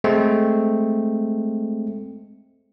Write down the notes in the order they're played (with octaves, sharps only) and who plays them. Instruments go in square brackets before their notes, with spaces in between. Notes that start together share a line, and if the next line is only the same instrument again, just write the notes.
[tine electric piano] G#3 A3 C4